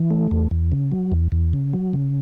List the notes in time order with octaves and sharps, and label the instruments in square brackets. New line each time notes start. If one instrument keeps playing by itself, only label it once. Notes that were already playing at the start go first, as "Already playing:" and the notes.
Already playing: [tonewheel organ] E3
A3
E2
E2
C#3
F#3
E2
E2
C#3
F#3
C#3